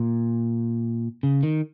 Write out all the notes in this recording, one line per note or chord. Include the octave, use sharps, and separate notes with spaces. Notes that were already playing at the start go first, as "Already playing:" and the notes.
Already playing: A#2
C#3
D#3